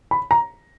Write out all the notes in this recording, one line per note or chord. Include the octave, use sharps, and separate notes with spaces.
B5
A#5